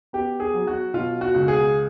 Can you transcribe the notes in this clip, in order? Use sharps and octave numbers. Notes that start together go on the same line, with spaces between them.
B3 G4
G#4
F#3
F#4
B2 F4
F#4
C#2
G#4